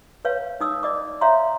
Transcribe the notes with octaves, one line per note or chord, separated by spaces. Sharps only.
B4 C#5 F5
D#4 D#6 E6
D5 D#5 D6
C#5 E5 F5 A#5 C6